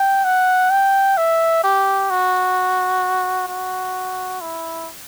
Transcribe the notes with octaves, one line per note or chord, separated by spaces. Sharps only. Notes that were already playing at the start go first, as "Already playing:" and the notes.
Already playing: G5
F#5
G5
E5
G4
F#4
F#4
E4